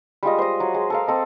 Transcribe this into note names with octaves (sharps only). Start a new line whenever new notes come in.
G3 G#3 F4 D#5
C5 D#5
F#3
G#3
A4 A#4 F5
C4 A4 D#5